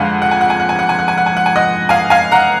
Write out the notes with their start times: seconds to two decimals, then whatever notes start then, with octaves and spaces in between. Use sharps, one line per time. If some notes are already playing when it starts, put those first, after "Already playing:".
Already playing: F2 D3 G#3 F5 F#5 G#5
0.22 F#5
0.31 G#5
0.41 F#5
0.50 G#5
0.60 F#5
0.69 G#5
0.79 F#5
0.89 G#5
0.99 F#5
1.08 G#5
1.17 F#5
1.26 G#5
1.37 F#5
1.46 G#5
1.56 D#5 F#5
1.89 F5 G#5
2.10 F5 G#5
2.31 F#5 A#5